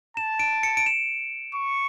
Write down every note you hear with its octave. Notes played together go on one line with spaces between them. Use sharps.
A5 E7
D7
C#7
D7
E7
C#6